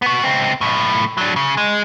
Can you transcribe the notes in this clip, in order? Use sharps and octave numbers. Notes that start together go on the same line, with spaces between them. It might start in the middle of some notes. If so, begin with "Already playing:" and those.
B3 F#4
C#2 C4
B1 A2
F#3 D4
C#3
G#3